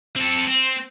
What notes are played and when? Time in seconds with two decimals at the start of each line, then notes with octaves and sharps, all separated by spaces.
0.16 C4 A4
0.47 C4